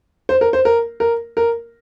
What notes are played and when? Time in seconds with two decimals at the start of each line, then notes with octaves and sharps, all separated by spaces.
0.29 C5
0.41 A#4
0.53 C5
0.65 A#4
1.00 A#4
1.37 A#4